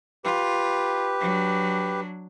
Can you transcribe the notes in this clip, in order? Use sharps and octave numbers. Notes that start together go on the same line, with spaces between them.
F4 G4 B4
F#3 D4